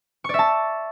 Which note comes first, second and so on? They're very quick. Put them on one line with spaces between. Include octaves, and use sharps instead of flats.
C#6 D5 E5 A5